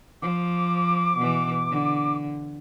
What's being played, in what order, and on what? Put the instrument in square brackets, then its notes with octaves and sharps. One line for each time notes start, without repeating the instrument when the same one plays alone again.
[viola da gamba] F3 [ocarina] D6
[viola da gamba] B2 E3
D3